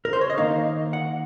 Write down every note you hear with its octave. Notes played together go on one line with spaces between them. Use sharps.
A#4
C5
C#5
D#5
D#3 A#3 D#4 F5
F#5